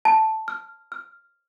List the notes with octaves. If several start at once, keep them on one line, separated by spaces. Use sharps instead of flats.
A5
F6
F6